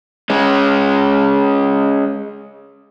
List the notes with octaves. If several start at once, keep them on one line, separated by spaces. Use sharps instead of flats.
G#3 C#4